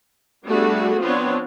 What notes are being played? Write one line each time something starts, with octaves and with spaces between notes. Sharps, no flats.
G3 A3 B3 D4 F#4 G#4
F3 B3 C4 D4 F4 C#5